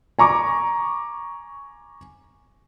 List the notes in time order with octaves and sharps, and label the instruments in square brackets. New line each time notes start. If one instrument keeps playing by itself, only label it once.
[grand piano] G#5 A#5 C#6 D6